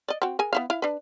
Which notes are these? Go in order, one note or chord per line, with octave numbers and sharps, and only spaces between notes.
D5 D#5
C4 F#4
G#4 A#4 G#5
B3 E4 F5
E4 F5
D4 B4